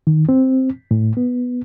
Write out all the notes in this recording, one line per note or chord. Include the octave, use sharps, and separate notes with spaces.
D#3
C4
A2
B3